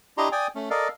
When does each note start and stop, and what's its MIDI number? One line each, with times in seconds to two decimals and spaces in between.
0.18 0.29 62
0.18 0.29 64
0.18 0.29 67
0.18 0.29 75
0.18 0.29 82
0.18 0.29 84
0.32 0.47 74
0.32 0.47 79
0.32 0.47 80
0.32 0.47 87
0.55 0.70 57
0.55 0.70 61
0.70 0.88 69
0.70 0.88 70
0.70 0.88 74
0.70 0.88 75
0.70 0.88 77